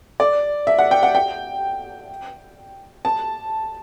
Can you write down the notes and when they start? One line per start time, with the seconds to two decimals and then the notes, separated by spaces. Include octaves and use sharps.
0.20 D5
0.67 E5
0.79 F#5
0.91 G5
1.03 F#5
1.15 G5
3.05 A5